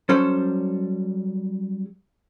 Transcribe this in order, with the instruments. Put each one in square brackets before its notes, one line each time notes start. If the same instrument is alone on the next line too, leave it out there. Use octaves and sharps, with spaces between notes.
[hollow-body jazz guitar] F#3 G3 C#4 A4 C5